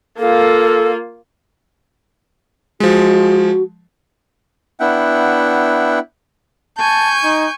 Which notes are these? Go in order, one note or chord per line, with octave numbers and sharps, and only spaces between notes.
A#3 F4 A4
F3 G#3 F#4
B3 D4 E4 E5 F#5 G5
G#5 A5 C#6 G6
D#4